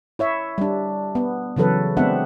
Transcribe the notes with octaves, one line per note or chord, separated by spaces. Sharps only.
E4 C#5 E5
G3 D4
B3
C#3 E3 F#3 A4 B4
G#3 B3 C4 D4 E5 F#5